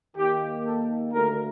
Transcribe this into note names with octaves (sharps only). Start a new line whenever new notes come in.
D#2 D#3 A#3 G4
A4
D2 D3 A3 A#4